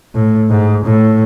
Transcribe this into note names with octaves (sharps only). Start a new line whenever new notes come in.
A2
G#2
A2